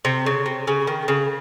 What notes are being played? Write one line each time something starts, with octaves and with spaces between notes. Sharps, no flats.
C3
C#3
C3
C#3
D#3
C#3